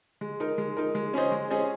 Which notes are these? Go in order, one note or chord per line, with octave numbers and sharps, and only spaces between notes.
G#3
D#4 A#4
G#3
D#4 A#4
G#3
C#4 G#4 C5 D#5
G#3
C#4 G#4 C5 D#5